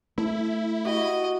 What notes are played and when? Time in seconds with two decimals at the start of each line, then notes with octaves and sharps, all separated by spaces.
0.18 A3 E4
0.85 F#4 G4 D#5 D6